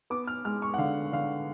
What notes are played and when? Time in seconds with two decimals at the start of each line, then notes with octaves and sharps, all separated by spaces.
0.10 B3 D6
0.27 F6
0.45 G#3 F6
0.62 C#6
0.74 F#5
0.78 D3 F5
1.12 D3 F5